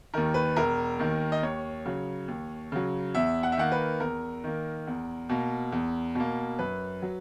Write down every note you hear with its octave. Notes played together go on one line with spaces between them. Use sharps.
D#2 D#3 A#4
B4
E1 A#4
D#2 D#3
D#5
D#2 C#5
C#3 F#3
D#2
C#3 F#3
E2 E5
F#5
E5
D#3 A#3 F#5
B4
E2 A#4
D#3 A#3
E2
B2 A#3
E2
B2 A#3
F#2 B4
F#3